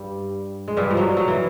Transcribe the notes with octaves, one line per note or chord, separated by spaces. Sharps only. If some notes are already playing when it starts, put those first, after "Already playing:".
Already playing: G2 G3
G#3
G2 G3
F3
F#3
F#3
E3